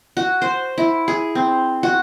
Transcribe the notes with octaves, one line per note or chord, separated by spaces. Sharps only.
F#4
C5
E4
G#4
C4
F#4